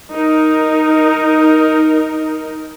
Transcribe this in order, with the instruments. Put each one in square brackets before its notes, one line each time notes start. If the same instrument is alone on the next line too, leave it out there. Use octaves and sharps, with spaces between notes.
[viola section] D#4 A#4